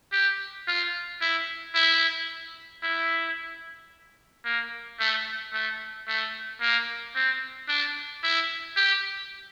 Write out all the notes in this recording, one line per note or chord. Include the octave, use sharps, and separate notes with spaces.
G4
F4
E4
E4
E4
A#3
A3
A3
A3
A#3
C4
D4
E4
G4